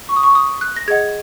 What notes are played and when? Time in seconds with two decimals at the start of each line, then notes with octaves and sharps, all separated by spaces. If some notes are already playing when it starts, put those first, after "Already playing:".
0.09 C#6
0.16 D#6
0.23 C#6
0.35 D#6
0.61 F#6
0.76 A#6
0.88 G#4 D#5 F#5 G#6